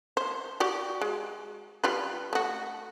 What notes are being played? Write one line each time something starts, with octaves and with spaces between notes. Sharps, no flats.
C5
F#4 G4 D5
G#3
G3 F4 B4
A3 F#4